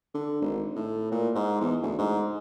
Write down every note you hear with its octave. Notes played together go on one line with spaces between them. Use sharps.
D3
G#1
A2
A#2
G#2
E2
D2
G#2